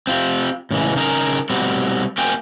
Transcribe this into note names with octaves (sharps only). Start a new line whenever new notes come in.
C4 F4 G4
A2 C#3 E3 G#3
C#3 D#4 G#4 A#4
B2 G3 C4 F#4
A#3 C4 F#4 G5 G#5